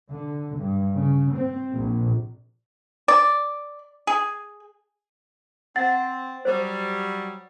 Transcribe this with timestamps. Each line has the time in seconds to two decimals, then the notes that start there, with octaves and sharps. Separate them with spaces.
0.12 D3
0.60 G2
0.96 C#3
1.33 C4
1.73 A#1
3.08 D5
4.07 G#4
5.76 C4 F#5 A6
6.45 F#3 G3 C5